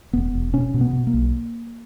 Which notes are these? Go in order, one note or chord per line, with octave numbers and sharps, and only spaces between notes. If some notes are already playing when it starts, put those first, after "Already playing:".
E1 B3
E1
B2 C#4
B2
B3
B2
A#3
B1